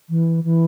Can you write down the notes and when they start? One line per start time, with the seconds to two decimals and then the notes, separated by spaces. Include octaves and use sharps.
0.09 E3
0.44 E3